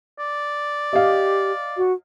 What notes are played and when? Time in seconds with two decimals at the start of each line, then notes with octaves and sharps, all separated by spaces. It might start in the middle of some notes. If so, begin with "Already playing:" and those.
0.19 D5
0.93 G4 D#5 F5
1.77 F#4